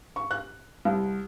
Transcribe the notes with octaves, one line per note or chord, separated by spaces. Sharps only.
C#6
F#6
C2